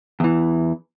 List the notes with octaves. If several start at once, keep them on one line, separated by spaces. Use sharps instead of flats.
E2 E3